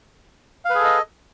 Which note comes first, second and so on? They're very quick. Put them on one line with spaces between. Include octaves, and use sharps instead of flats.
F5 B4 G#4 A4 D#5